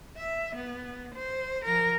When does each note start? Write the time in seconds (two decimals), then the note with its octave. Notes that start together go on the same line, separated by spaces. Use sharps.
0.17 E5
0.55 B3
1.15 C5
1.65 F3 A#4